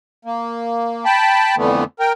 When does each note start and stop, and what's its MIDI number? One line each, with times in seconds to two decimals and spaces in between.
0.25 1.05 58
1.05 1.55 79
1.05 1.55 81
1.05 1.55 83
1.57 1.84 41
1.57 1.84 50
1.57 1.84 52
1.57 1.84 57
1.57 1.84 59
2.00 2.13 70
2.00 2.13 79